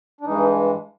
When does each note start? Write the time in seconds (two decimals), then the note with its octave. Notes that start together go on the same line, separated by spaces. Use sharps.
0.21 D4
0.25 G2 E3 G#3 D#4